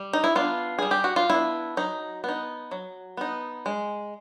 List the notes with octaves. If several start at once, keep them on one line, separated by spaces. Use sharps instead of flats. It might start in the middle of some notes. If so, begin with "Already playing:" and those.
Already playing: G3
D#4
E4
B3 D4 F4
G3 G#4
G4
F#4
F4
B3 D4 E4
F#3 D#4
B3 D#4
F#3
B3 D#4
G#3